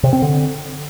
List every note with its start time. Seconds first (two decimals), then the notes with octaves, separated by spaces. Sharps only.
0.03 C3
0.13 C4
0.22 D3